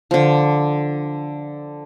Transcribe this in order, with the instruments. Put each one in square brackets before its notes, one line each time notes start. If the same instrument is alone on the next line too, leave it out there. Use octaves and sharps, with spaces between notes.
[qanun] D3 F3